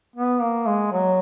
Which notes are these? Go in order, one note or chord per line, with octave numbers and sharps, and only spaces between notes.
B3
A#3
G#3
F#3